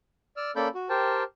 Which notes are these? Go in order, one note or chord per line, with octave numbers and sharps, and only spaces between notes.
D5 E6 F6
A#3 C#4 A4 D5 B5 G6
F#4
G4 A#4 C5 G5 A5